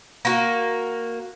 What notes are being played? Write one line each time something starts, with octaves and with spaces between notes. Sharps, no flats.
A#3 F#4